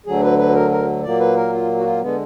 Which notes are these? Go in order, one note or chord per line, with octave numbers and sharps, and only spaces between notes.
D2 D3 F#3 G#4
B4
B4
A#4
A#4
A#2 F#3 A#3 D5
B4
A#4
F4
F#4
F4
D3 G#3 B3